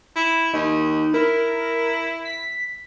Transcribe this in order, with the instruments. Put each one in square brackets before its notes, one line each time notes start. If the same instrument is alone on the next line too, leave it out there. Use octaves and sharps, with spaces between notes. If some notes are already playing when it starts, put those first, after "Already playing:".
[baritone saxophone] E4
[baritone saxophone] D#2 [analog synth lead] D#4
[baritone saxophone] E4 [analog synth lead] A#4
[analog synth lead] B6